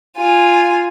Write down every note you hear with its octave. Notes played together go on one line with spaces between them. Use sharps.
F4 G#5